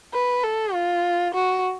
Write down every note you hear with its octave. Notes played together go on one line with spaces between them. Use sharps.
B4
A4
F4
F#4